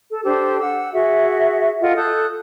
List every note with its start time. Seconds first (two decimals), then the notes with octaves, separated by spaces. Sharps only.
0.10 A4
0.24 D4 G4 A4 C5
0.61 F#5 E6
0.93 F#4 G#4 E5
1.81 F4 A4 D#5 F#5
1.96 A4 D#6 F#6 G6